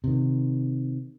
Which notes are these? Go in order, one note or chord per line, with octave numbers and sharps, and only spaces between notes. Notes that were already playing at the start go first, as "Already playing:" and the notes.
C3 D#3